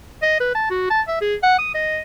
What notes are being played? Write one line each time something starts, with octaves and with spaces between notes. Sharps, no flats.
D#5
B4
A5
F#4
A5
E5
G#4
F#5
D#6
D#5